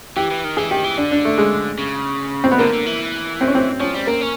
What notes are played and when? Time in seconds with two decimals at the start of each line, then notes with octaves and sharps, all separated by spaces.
0.17 E3 G4
0.31 E3
0.44 D#3
0.57 E3 G#4
0.71 D#3 G4
0.84 E3
0.98 D3 D4
1.12 D4
1.25 A3
1.38 G#3
1.79 C#3
2.44 C4
2.52 B3
2.59 D3 A#3
2.73 D3
2.86 E3
3.41 C4
3.47 C#4
3.55 C4
3.80 F3 C#4
3.94 G3
4.07 A#3 C4
4.21 C#4